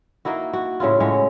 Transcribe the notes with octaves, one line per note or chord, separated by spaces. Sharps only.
A#3 D#4 E4 F#4
F#4
A2 C#3 E4 F4
A2 G#3 F#4 C#5